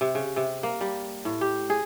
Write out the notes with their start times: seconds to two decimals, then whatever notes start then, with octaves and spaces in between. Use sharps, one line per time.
0.01 C3
0.15 C#3
0.36 C3
0.63 A#3
0.81 G3
1.25 A2
1.41 G4
1.70 G#4